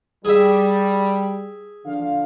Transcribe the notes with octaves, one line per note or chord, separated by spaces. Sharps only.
G3 G#4 E5
D3 F3 F5